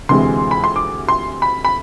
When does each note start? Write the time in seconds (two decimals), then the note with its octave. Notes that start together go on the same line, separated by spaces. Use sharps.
0.09 D2 C3 E3 G#3 C6
0.51 B5
0.64 C6
0.76 D6
1.08 C6
1.42 B5
1.65 B5